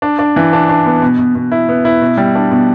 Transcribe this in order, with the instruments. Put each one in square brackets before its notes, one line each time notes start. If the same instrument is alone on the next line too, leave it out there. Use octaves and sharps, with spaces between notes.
[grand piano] D4
D4
E3
D4
D4
B3
B2
B2
B2
E4
B3
E4
B2
G3
D4
B2